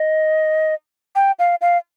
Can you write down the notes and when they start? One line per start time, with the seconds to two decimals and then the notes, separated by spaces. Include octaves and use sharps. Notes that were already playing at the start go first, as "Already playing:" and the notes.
Already playing: D#5
1.16 G5
1.39 F5
1.61 F5